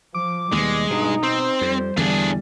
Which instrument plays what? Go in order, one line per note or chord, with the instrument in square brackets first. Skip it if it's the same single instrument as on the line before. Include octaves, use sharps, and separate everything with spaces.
[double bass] F3 [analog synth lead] D6
[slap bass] D#2 B2 [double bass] G3 [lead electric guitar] G#3
[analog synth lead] G2 [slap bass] B2 [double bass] D#4
[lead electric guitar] C4 [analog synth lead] C5
[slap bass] F2 [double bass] G3
[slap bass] E2 D3 E3 [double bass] G3 [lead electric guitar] D4 G#4